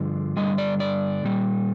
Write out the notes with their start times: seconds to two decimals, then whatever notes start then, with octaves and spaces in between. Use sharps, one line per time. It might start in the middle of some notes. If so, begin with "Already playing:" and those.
Already playing: G2 D3 F3
0.37 G2 D3 G3 D#5
0.58 D5
0.80 D5
1.24 A#2 G3